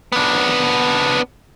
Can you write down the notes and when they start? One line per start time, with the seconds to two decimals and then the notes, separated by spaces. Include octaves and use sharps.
0.12 B3 D4